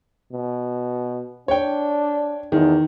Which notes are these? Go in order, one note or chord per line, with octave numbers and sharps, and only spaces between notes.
B2
D4 C#5 G5
E2 D#3